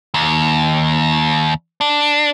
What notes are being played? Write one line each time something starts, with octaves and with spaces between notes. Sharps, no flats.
D#2
D4